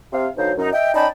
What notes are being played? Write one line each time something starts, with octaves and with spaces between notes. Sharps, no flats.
C3 F5
D2 B2 F#3 D#4 C5 F5
F#2 D#4
D#5 E5 G5
C#4 D#4 D5 G5 A5 B5